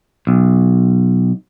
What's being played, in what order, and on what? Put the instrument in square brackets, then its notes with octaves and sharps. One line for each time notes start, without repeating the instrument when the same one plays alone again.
[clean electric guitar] B1